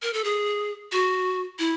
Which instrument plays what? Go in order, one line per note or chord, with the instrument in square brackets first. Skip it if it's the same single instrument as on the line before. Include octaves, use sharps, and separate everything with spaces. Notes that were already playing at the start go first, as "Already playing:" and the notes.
[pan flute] A#4
A4
G#4
F#4
E4